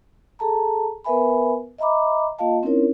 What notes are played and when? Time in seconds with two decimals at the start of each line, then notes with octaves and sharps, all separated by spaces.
0.39 G#4 A4 A5 A#5
1.04 B3 A#4 B4 E5 G#5 B5
1.78 D#5 E5 A#5 B5 D6
2.39 A#3 F4 D#5 F5 A5
2.63 C4 C#4 D#4 E4 A#4 C#5